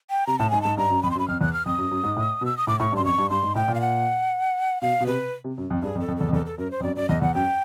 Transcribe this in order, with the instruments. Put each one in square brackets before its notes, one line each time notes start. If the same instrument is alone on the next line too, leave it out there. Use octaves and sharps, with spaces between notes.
[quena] G5
[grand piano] C3 [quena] A#5
[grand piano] A2 [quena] A5
[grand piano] G#2 [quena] G#5
[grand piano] G#2 [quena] A5
[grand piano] G2 [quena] A#5
[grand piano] F#2
[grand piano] F2 [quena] B5
[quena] C6
[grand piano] F#2
[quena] B5
[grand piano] F2 [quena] F6
[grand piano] E2 [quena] F#6
[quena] F6
[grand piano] F2 [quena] D#6
[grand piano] F#2
F#2
G#2
A2
B2
[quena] E6
D#6
[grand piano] A2 [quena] D6
[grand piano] A2 [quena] C#6
[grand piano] G2
[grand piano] F#2 [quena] C6
[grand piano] F2 [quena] C#6
[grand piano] G2
[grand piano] G2 [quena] C6
[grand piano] G#2
[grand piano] A2 [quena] G5
[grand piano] A#2
[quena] F5
F#5
[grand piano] B2 [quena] F5
[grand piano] B2
[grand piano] C3 [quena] B4
[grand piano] C3
F#2
F2
[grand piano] G2 [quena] G#4
[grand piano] F2
[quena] A4
[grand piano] F2
[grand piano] E2 [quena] A4
[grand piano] F2
[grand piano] E2 [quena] A4
[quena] A4
[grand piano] F#2 [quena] A#4
[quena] C5
[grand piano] F2
[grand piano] F#2 [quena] D5
[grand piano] F#2 [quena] D5
[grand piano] E2 [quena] D#5
[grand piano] E2 [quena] F#5
[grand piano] F#2 [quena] G5